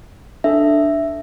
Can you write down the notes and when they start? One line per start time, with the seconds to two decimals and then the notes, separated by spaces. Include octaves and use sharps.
0.44 D4 A4 E5